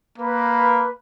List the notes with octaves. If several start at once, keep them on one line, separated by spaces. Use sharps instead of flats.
A#3 B4